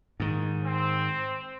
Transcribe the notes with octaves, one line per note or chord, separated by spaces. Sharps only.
G#2 D#3
C4